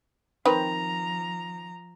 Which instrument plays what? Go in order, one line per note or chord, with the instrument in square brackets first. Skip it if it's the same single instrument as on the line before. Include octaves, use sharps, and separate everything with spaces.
[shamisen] D#3 C4 B4 [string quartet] F3 A#5